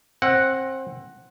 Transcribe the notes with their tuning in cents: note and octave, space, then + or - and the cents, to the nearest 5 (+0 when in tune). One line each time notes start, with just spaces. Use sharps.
C4 +25 F#5 +0